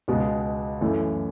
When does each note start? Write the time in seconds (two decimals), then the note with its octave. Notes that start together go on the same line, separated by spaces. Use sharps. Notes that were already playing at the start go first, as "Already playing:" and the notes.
0.08 C#2 B2 G#3
0.81 F#2 E3 A3